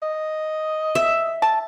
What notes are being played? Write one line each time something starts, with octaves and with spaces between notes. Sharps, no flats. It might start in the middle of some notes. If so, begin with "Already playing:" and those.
D#5
E5
A5